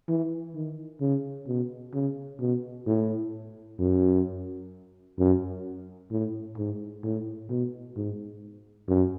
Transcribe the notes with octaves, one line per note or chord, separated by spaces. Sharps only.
E3
D#3
C#3
B2
C#3
B2
A2
F#2
F#2
A2
G#2
A2
B2
G#2
F#2